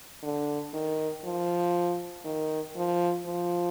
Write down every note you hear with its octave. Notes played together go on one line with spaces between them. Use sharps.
D3
D#3
F3
D#3
F3
F3